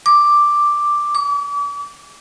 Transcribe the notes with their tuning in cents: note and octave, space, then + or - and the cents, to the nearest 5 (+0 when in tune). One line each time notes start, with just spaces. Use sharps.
D6 +5
D6 -40